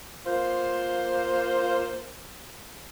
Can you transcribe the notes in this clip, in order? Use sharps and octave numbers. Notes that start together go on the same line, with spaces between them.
A#3 F4 C5